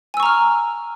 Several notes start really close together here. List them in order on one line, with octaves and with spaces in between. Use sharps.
G#5 E6 C#6 A#5 F6